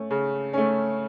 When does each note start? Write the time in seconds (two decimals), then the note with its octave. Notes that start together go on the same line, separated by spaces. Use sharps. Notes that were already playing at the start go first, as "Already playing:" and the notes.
Already playing: A3 C#4
0.10 C#3
0.53 A3 C#4